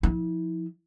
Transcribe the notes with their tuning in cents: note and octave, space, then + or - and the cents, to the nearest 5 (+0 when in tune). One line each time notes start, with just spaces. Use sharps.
F3 +0 E4 -35